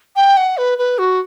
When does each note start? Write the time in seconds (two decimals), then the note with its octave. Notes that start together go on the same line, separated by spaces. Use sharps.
0.16 G5
0.37 F#5
0.57 B4
0.78 B4
0.98 F#4